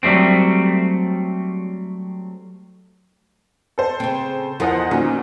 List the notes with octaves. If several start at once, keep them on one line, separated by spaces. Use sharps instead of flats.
F#3 G3 A3 C4
A4 C5
C#3 C4
E2 F3 A4 A#4 D#5 F#5
A#2 D#3 C#4 F#4